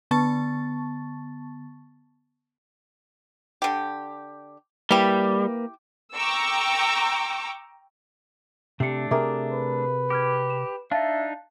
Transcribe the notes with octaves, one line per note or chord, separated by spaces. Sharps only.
D3 B3 A5 C#6 A6
D3 G4
G3 A#3 E4 G4 B4
G5 A#5 C#6 D6 E6
C3 A3 D4 C7 C#7
C3 G#4 A#4 E5 A#5 D6
B4
G4 D6 F6 G#6
E7
D4 D#4 E5 F5 A5 A6